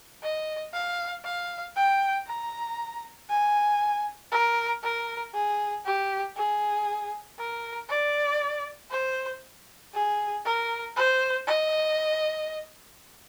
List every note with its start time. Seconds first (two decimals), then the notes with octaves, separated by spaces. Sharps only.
0.23 D#5
0.74 F5
1.25 F5
1.76 G5
2.27 A#5
3.30 G#5
4.32 A#4
4.83 A#4
5.34 G#4
5.85 G4
6.36 G#4
7.39 A#4
7.89 D5
8.91 C5
9.94 G#4
10.45 A#4
10.96 C5
11.47 D#5